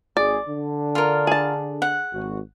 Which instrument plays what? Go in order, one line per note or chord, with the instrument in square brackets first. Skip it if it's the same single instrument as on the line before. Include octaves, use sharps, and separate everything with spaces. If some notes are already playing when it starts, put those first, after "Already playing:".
[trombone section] G#1 G#4 [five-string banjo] D5
[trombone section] D3 D4
[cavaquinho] F4 A#4
[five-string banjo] G#4 A5
[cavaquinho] F#5
[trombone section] G#1 F#4